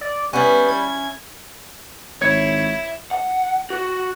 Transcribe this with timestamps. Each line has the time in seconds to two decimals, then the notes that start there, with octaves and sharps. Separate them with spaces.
0.01 D5
0.33 G3 B3 C#4 E4
0.68 G#6
2.21 G#1 E4 C#5 G#6 C#7
3.11 F#5
3.70 F#4